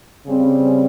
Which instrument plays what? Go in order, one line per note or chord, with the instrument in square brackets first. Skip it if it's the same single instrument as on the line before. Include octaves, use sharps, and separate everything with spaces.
[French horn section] C#3 G3 C4